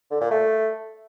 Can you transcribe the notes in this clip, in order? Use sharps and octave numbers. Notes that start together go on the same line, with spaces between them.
D3
A#2
A3